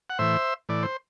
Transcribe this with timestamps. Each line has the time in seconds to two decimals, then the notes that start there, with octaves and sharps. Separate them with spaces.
0.10 F#5
0.19 A2 E3 C5 E5
0.69 A2 E3 D5
0.83 C5